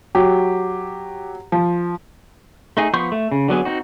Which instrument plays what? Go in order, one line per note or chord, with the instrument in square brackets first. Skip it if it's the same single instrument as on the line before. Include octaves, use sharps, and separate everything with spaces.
[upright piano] F#3 [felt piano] G4
[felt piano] F3
[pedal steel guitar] A3 D#4 G#4
F3 B3 C6 C#6 G6
A3
C#3
D3 F#3 B3 G#4
C4 D#4 F#4